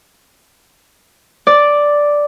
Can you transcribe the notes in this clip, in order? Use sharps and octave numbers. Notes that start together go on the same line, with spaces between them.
D5